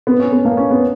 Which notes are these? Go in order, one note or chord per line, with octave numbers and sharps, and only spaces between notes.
B3
C#4
B3
A#3
C#4
B3